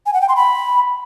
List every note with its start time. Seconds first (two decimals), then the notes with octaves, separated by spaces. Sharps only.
0.06 G#5
0.14 F#5
0.21 G5
0.29 C6
0.36 B5